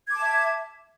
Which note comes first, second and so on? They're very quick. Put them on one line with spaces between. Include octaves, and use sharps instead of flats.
G#6 D6 A5 E5